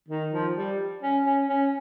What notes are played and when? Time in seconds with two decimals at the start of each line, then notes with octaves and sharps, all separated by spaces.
0.08 D#3
0.32 F3
0.56 G3
1.02 C#4
1.25 C#4
1.49 C#4